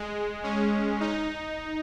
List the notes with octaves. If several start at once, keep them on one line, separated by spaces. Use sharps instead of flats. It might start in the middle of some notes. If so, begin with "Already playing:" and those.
Already playing: G#3
C#4
D#4